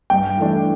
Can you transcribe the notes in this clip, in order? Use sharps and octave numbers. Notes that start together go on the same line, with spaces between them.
G2 G5
E3 A3 D4